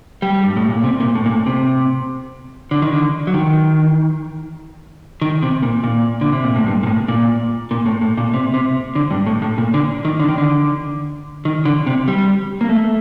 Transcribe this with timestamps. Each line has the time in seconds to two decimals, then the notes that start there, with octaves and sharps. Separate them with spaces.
0.22 G3
0.44 G2
0.56 A2
0.70 A#2
0.84 C3
1.00 A#2
1.15 A2
1.26 A#2
1.31 A2
1.46 C3
2.71 D3
2.82 D#3
2.92 D3
3.27 F#3
3.34 D#3
5.21 D#3
5.42 C3
5.63 A#2
5.84 A#2
6.21 D3
6.32 C3
6.44 A#2
6.56 A2
6.67 G2
6.83 A#2
6.87 A2
7.08 A#2
7.71 A#2
7.86 A2
8.01 A2
8.17 A#2
8.34 C3
8.54 C3
8.95 D3
9.11 G2
9.26 A2
9.42 A2
9.58 A#2
9.74 D3
10.05 D#3
10.20 D3
10.28 D#3
10.38 D3
11.45 D#3
11.65 D3
11.87 C3
12.08 G3
12.61 A#3
12.69 A3